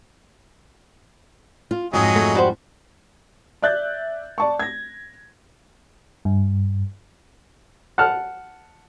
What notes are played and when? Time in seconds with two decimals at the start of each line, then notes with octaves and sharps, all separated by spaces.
1.71 F4
1.93 F2 G#2 F#3 G#3 G#4 D#5
2.16 A3
2.35 G3 F#4 C5
3.62 D5 E5 F#6 G6 A6
4.38 D5 A5 C#6
4.60 G#6 A#6
6.25 G2
7.98 F#5 A5 F6